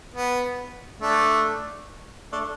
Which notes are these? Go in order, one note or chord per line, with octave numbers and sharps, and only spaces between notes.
B3
A3 D4
A3 D4